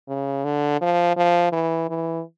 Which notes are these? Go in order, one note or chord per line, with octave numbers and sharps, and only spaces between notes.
C#3
D3
F3
F3
E3
E3